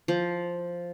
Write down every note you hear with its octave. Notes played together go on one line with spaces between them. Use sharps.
F3